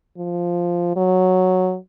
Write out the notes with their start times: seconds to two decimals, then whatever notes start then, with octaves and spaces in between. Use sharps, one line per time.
0.18 F3
0.96 F#3